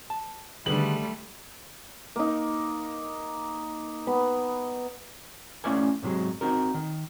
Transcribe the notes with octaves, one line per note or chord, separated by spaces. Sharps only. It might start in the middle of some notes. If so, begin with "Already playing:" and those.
A5
D3 D#3 G3 A3 G#4 B4 F#7
A#3 D#4
B3 B5
A3 C#4 E4 D5 F5 G#5
G#2 C3 F#3 G#3
C4 D#4 F#4 A#4
D#3